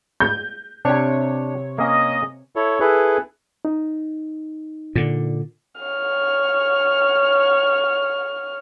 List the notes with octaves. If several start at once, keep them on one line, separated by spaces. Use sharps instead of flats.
G6
C3 D4 G4 C#5
A#3 C#4 D#5
E4 A4 C#5
E4 G#4 A4 B4
D#4
A#2 D3
C#5 F6